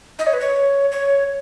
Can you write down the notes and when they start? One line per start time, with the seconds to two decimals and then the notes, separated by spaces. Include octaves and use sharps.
0.19 D#5
0.27 C#5
0.33 B4
0.41 C#5
0.91 C#5